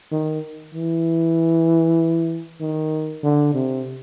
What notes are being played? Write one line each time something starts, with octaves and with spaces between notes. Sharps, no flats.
D#3
E3
D#3
D3
C3